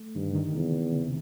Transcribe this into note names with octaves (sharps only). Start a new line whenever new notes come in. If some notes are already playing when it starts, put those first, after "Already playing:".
Already playing: A3
G2 D#3
D3
D#3
E2 C3
C#3
C3